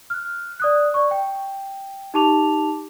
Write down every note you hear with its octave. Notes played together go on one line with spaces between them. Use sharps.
F6 F#6
D5 D#6 F#6
D5 C#6
G5
D#4 G4 A5 D6 F7